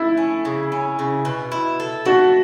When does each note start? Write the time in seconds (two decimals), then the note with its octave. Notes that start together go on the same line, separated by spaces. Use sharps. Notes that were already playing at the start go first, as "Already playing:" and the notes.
Already playing: A3 E4
0.17 C#4
0.45 C#3
0.72 C#4
0.99 C#3
1.25 B2
1.52 E4
1.80 A4
2.05 A3 F#4